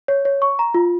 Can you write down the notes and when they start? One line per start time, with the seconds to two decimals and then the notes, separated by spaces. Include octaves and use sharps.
0.08 C#5
0.25 C#5
0.42 C#6
0.59 A#5
0.74 F4